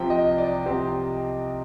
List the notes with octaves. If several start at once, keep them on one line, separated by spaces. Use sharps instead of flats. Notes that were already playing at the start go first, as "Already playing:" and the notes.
Already playing: C2 C3 F3 C4 G5
D#5
D5
C2 C3 F3 C4 G4